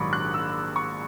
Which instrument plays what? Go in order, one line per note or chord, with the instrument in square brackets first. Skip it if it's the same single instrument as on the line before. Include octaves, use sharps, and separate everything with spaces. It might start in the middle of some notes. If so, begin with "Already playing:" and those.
Already playing: [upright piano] A#1 G#2 D#3 F#3 B5 C#6 D6
F#6
E6
C#6